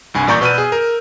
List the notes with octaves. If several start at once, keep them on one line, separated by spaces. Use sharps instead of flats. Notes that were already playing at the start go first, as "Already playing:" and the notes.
C2 G2 G#5
A1 A#2 D5 A#5 C#6 G6
B2 B4 D5 E6 F6 D#7
G#4
A#4